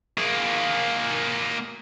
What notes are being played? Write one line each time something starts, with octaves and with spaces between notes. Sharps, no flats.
A#3 G#4